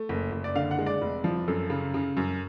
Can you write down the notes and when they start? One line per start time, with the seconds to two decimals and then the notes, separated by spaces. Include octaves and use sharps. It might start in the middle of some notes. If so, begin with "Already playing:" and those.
Already playing: A3
0.09 F#1
0.32 F#1
0.44 D5
0.55 D3 F5
0.71 F#5
0.79 G#3
0.86 D5
1.01 F1
1.24 F3
1.48 F#2 A4
1.70 C#3
1.94 C#3
2.17 F#2